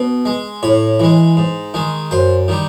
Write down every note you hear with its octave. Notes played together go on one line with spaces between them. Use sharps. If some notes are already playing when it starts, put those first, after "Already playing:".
Already playing: B2
G#3
A2 C#5
E3 G#3
G#2
D#3 G#3
F#2 C5
D#3 G3